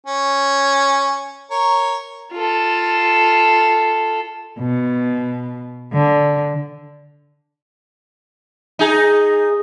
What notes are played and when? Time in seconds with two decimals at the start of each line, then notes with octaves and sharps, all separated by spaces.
0.07 C#4
1.51 A#4 C#5
2.32 F4 A4
4.60 B2
5.93 D3
8.79 D#4 G#4